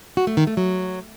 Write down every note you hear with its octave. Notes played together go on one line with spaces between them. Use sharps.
F#4
A3
D#3
A3
F#3